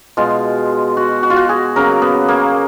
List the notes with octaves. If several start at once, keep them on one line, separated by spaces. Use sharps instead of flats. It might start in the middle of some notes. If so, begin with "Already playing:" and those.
B2 G#3 F4
F#4
F#4
F4
F#4
G#4
C#3 F#3 A#3 A#4
B3
A#3